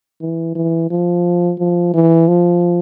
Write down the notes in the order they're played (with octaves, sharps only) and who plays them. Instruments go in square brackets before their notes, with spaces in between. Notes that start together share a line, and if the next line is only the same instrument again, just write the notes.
[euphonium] E3
E3
F3
F3
E3
F3